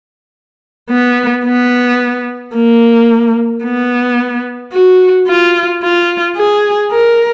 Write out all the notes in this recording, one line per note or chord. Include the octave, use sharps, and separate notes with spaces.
B3
B3
A#3
B3
F#4
F4
F4
G#4
A#4